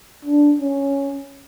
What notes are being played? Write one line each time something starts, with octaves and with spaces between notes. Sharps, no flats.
D4
C#4